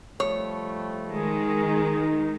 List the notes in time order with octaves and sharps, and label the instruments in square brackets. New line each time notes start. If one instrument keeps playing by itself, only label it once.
[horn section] F3 G3 A3 [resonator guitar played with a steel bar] C#5
[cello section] D#3 G#3 [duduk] G#4
[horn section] D#4